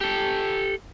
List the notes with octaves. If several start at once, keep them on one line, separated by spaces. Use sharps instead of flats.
G4 A4